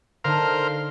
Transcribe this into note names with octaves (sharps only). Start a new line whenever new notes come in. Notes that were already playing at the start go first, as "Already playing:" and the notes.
D3 D#4 A#4 C5 F5